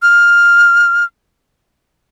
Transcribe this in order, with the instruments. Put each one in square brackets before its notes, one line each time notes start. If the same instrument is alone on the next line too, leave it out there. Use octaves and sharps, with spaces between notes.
[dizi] F6